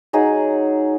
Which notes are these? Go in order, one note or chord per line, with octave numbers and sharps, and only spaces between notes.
F#3 D#4 G#4